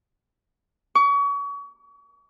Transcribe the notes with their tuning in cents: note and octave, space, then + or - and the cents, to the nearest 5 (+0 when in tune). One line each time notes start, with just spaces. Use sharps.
C#6 +35